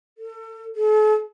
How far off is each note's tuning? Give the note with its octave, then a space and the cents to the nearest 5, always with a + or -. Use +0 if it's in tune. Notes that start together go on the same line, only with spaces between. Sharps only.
A4 +35
A4 -45